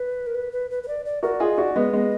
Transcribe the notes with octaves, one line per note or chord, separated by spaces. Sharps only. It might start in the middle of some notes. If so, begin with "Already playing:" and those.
Already playing: B4
A#4
B4
B4
B4
B4
D5
D5
F#4 A#4 D5
F4 G#4 D#5
D#4 F#4 D5
G#3 B3 D#5
G#3 B3